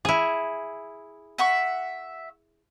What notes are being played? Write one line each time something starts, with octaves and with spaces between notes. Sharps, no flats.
E4 G#4
E5 F#5 C#6